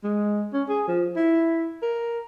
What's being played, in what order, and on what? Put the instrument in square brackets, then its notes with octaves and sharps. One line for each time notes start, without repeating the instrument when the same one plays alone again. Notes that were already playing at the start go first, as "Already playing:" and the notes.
[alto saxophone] G#3
C#4
G#4
F3
E4
A#4